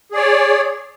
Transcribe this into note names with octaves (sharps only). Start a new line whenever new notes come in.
G#4 C#5 D5